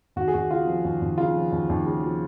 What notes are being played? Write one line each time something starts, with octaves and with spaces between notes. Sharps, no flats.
D#2 F#4
G#4
D#2 F#4
C#3 F4
F3
D#2
D#2
C#3 F4
F3
D#2
D#2
C#3
F3